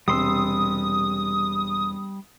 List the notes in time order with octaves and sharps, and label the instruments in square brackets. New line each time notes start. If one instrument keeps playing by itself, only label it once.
[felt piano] E1 C3 [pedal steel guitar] G3 C6 E6 [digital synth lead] D#6